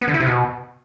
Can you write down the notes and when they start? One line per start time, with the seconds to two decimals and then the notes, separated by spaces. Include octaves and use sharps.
0.01 B3
0.08 D3
0.14 E4
0.20 C3
0.27 B2